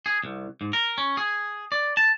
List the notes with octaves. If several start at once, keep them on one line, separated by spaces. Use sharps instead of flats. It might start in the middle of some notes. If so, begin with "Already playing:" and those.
G#4
C2
G#2
A#4
C#4
G#4
D5
A5